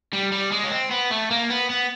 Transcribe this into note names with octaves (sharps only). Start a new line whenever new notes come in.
G3
G3
G#3
C#4
C4
B3
A3
A#3
B3
B3